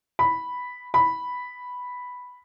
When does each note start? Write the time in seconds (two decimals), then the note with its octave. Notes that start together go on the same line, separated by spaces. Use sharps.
0.19 B5
0.94 B5